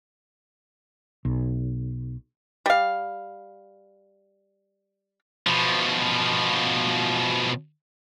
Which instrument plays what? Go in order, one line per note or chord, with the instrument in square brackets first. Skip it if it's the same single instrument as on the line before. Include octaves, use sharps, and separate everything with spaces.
[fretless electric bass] B1
[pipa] G3 F5
[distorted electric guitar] B2 F3